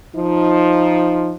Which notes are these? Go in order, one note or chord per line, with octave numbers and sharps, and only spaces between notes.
F3 D#4